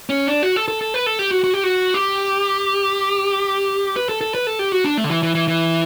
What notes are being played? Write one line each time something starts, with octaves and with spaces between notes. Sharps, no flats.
C#4
D4
F#4
A4
A4
A4
B4
A4
G4
F#4
F#4
G4
F#4
G4
B4
A4
A4
B4
A4
G4
F#4
D4
A3
D3
E3
E3
E3
E3